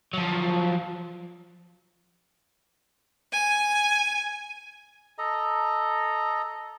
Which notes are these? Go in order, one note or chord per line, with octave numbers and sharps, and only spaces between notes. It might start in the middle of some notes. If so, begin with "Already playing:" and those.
F3 F#3
G#5
A4 D#5 A#5